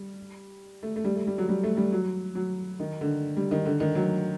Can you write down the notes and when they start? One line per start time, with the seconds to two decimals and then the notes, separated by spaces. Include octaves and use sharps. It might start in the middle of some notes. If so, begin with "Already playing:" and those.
Already playing: G3
0.83 A3
0.96 A3
1.04 G3
1.15 A3
1.27 G3
1.38 F#3
1.49 G3
1.64 A3
1.77 G3
1.92 F#3
2.35 F#3
2.80 D#3
3.01 D3
3.37 G3
3.51 D#3
3.66 D3
3.80 D#3
3.95 F#3